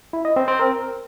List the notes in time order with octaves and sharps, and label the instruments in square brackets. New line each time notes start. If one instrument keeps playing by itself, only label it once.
[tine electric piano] E4
D#5
C4
C4
A#4